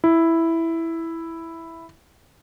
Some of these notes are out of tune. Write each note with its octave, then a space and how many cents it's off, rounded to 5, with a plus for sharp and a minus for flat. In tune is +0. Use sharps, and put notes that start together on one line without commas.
E4 +0